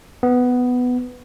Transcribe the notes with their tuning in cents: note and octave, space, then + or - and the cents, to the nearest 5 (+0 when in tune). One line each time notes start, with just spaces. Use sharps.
B3 +5